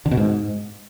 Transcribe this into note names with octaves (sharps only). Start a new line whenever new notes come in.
D3
B2
G#2